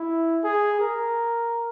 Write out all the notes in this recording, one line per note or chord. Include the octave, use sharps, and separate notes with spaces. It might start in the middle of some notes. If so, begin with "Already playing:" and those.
Already playing: E4
G#4
A#4